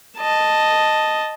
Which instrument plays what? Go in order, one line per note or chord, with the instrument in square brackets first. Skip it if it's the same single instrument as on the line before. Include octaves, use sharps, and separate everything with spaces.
[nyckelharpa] D#5 A5